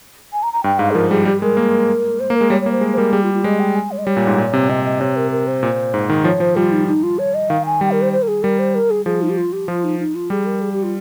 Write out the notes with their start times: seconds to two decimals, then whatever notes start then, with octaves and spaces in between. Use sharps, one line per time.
0.33 G#5
0.43 A#5
0.53 A#5
0.64 G2 G5
0.79 G#2 F5
0.91 G#4
0.95 F3 A#4
1.11 G3 G#4
1.25 G3 G4
1.41 G#3 A#4
1.57 A#3
2.20 C5
2.30 A#3
2.35 A#4
2.41 G#3
2.50 G3 C#5
2.61 C#5
2.66 A#3
2.72 C5
2.81 G#3
2.93 C5
2.98 G3 A#4
3.13 G3 G#4
3.23 F4
3.34 F4
3.44 G#3 D#5
3.60 G5
3.76 G#5
3.91 C#5
3.98 D#5
4.05 G3 C#5
4.17 A#2
4.27 G#2
4.38 A#2
4.53 C3
4.69 C3 D#5
4.85 D#5
5.00 C3 C#5
5.16 A#4
5.31 A#4
5.47 C5
5.63 A#2
5.94 G#2
6.09 D#3
6.24 F3 C#5
6.40 F3 C5
6.56 G3 F4
6.72 D#4
6.87 D#4
7.03 F4
7.19 C#5
7.34 D#5
7.50 D#3 F5
7.65 G#5
7.81 G3 G5
7.91 A#4
8.02 C5
8.12 C5
8.22 A#4
8.28 G#4
8.43 G3 A#4
8.59 C5
8.75 A#4
8.90 G#4
9.05 F3 G#4
9.22 D#4
9.29 G4
9.37 F4
9.53 G4
9.68 F3 F4
9.84 D#4
9.99 D#4
10.15 F4
10.30 G3 G#4
10.46 A#4
10.62 G#4
10.72 G4
10.83 F4